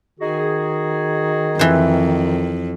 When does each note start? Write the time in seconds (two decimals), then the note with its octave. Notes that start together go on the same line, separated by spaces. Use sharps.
0.19 D#3 D#4 F#4 G#4
1.59 F2 E3 C5